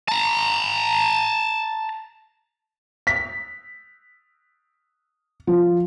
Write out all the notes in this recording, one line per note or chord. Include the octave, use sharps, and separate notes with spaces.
A5 A#5
B6
F3